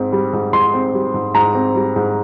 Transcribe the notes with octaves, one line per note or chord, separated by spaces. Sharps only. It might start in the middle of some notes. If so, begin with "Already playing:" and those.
Already playing: G#2 C4
G3
G#2
G#2 C6
C4
G3
G#2
G#2 A#5
C4
G3
G#2